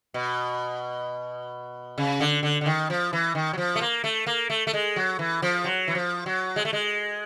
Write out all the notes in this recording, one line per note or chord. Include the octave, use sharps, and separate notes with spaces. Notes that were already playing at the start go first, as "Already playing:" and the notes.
B2
C#3
D3
D3
D3
D#3
F3
E3
D#3
F#3
F3
A3
A#3
A3
A#3
A3
A3
G#3
F#3
E3
F3
F#3
E3
F3
F#3
G#3
A3
G#3